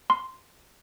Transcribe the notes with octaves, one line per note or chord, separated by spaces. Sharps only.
C6